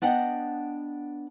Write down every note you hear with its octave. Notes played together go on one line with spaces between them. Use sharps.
B3 D4 D#5 F#5 G5